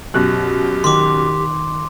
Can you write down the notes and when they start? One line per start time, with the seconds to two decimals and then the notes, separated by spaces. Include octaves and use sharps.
0.14 F#2 B2 G4 F#6
0.84 D#3 C6 D6